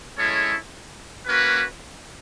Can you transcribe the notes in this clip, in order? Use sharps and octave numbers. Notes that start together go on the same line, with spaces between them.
G#3 C#4 E4 A4 C#5
A#3 C#4 F#4 B4